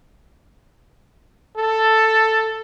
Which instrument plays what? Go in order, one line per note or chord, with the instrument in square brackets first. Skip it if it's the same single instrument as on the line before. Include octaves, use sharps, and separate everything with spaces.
[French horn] A4